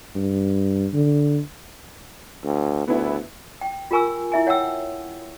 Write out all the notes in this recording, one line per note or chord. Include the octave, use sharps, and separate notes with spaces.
G2
D3
D2
D2 B3 E4
G5
F4 G4 A#4 G#5 C#6 E6
E4 E5 G#5
C#5 F#5 G5 E6